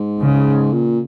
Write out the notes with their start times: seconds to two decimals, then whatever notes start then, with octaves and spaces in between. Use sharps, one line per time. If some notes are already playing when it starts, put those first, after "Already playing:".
Already playing: G#2
0.22 C#3
0.72 A#2